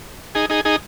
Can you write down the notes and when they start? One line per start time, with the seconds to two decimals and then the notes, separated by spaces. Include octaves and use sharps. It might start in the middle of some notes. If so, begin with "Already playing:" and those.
0.35 D#4 G#4
0.50 D#4 G#4
0.65 D#4 G#4